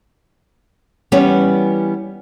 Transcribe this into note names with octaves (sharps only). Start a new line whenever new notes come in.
E3 G3 B3 C#4